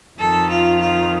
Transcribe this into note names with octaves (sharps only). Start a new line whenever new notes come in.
F2 D#3 A4
F4
F4